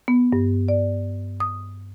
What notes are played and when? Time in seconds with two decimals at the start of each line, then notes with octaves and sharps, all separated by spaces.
0.08 B3
0.33 G2
0.68 D5
1.40 D#6